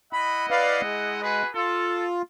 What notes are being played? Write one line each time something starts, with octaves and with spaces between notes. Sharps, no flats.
E4 D#5 F#5 B5
B4 D5 F5
G#3
F#4 G#4 B4
F4 A4